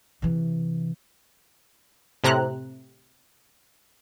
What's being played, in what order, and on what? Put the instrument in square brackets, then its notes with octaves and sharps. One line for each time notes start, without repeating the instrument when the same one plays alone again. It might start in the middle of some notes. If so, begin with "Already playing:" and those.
[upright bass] C3 E3
[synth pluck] A2 C3 A#5 F#6